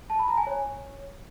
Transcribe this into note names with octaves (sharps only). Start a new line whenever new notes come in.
A5
B5
A#5
G#5
C#5